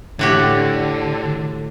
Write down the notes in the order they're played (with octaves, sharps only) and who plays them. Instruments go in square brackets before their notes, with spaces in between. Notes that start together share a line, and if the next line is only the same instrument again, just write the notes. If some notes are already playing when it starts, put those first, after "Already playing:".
[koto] A2 F#4 G4 [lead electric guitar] D3